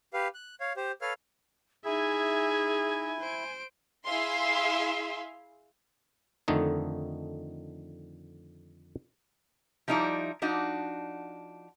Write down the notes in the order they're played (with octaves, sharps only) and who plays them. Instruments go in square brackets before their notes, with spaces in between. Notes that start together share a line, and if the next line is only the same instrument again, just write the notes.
[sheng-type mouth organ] G4 B4 F5
F#6
C#5 F5
G4 C5
A4 B4 C#5 F5 F6
[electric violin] D#4 E5 [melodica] E4 [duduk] G#4 [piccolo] G#5
[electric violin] C5 D7
[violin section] E4 G#4 E5 F5 C6
[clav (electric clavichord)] F2 D3 D#3 A3 D#4
[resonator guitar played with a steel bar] F3 G3 D#4 E4 D5
F3 D4 D#4 F#4